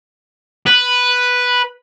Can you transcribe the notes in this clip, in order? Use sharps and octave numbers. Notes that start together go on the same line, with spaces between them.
B4